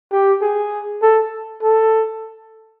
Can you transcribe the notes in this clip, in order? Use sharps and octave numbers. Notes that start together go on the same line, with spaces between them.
G4
G#4
A4
A4